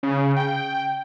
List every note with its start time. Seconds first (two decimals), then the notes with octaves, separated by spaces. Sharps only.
0.03 C#3
0.36 G5